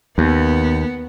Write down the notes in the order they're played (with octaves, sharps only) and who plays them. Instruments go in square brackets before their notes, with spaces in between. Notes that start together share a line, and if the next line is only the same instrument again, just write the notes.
[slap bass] D#2 [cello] B3